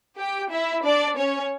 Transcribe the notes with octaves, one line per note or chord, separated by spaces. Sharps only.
G4 G5
E4 E5
D4 D5
C#4 C#5